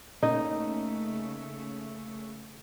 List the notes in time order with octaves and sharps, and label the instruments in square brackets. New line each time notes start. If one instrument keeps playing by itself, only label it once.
[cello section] C#3 A3 [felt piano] A#3 C#4 [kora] D#4 D#5